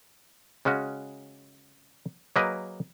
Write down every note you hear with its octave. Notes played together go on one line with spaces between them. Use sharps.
C#3 G#3 C#4 F#4
F#3 A#3 G#4 A#4 B4 D#5